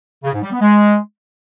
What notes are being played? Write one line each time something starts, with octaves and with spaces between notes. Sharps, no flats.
C#3
G#2
G3
B3
G#3